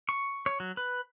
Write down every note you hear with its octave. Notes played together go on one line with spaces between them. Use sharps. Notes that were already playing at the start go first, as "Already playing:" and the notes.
C#6
C#5
F#3
B4